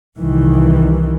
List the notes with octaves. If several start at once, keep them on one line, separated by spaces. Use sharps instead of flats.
C2 D#3 E3